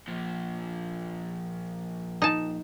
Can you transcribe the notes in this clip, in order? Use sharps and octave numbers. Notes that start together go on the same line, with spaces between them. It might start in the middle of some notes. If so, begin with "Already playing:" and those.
A#2 F3
D#4 A5